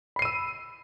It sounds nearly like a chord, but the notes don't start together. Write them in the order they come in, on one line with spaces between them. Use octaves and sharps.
B5 C7 D#7 E6